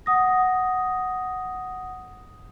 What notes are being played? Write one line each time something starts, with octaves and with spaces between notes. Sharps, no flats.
F#5 D#6 A#6